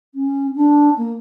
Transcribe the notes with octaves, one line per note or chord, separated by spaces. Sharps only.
C#4
D4
A#3